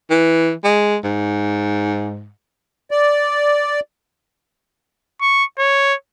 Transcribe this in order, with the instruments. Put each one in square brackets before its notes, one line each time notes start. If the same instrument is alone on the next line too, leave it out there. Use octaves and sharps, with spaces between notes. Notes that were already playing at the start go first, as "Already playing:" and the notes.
[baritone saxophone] E3
G#3
G#2
[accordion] D5
[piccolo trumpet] C#6
C#5